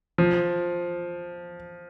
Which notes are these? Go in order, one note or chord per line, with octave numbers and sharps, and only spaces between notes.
F3